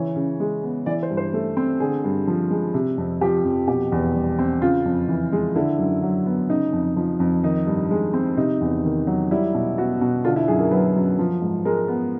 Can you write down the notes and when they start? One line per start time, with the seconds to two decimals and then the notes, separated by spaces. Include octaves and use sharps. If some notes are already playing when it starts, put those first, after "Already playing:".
Already playing: C#3 E3 C#5
0.16 C#3
0.40 G#3
0.63 B3
0.86 E3 D5
1.03 C5
1.10 G2
1.17 C5
1.34 A3
1.57 C4
1.80 D3 G#4
2.04 G2
2.27 F3
2.51 G#3
2.74 C3
2.98 F2
3.21 F3 G4
3.45 F2
3.68 B2 G4
3.92 E2
4.15 G3
4.39 C4
4.62 C#3 F4
4.85 F2
5.08 E3
5.32 G#3
5.55 D3 E4
5.79 F#2
6.03 F#3
6.26 B3
6.49 C#3 D#4
6.73 F2
6.96 F3
7.20 F2
7.43 D#3 D#4
7.67 G2
7.91 G#3
8.14 C4
8.37 C3 D#4
8.61 E2
8.84 D#3
9.07 F#3
9.31 G3 E4
9.54 B2
9.78 B3 F#4
10.01 B2
10.24 D3 F4
10.36 E4
10.48 F#2 G#4
10.60 A#4
10.71 F#3 B4
10.96 F#2
11.19 F3
11.42 G#2
11.65 G#3 A#4
11.88 B3